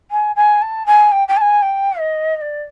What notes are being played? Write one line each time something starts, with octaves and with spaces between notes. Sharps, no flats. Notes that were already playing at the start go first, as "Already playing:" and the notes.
G#5
G#5
A5
G#5
G5
G5
A5
G#5
G5
D#5
D#5
D5